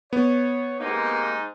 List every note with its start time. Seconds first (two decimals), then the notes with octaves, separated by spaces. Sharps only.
0.13 B3 C#5
0.80 G#2 A#3 C4 D#4 G4